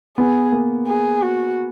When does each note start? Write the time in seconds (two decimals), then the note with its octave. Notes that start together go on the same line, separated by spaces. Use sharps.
0.17 B3 G#4
0.52 A#3
0.87 G#4
1.22 F#4